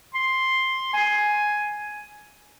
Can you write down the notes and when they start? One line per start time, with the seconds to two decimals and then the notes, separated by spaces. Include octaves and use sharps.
0.15 C6
0.94 G#5